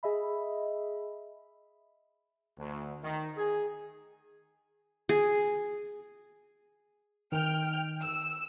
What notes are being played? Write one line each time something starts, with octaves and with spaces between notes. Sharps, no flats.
G#4 D#5 E5 B5
D2
D#3
G#4
G#4
D#3 G5 F6
E6